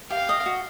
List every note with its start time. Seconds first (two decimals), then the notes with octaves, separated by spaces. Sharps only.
0.10 G4 F5
0.29 D#5
0.46 F#4